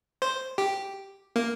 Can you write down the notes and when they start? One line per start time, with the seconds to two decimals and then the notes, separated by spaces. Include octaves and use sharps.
0.22 C5
0.58 G4
1.36 A#3